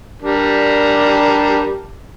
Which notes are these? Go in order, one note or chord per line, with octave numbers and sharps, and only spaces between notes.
G3 D4 A#4